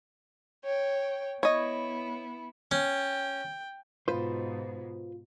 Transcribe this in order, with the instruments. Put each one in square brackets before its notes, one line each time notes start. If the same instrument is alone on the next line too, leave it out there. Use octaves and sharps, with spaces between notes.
[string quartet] C#5 G5
[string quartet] B3 E4 [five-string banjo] C#5 D#5
[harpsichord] C#4 [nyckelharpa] G5
[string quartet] G#2 B2 [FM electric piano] F4 [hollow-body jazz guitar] B4 C5